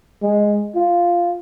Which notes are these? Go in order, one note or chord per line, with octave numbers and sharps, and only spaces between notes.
G#3
F4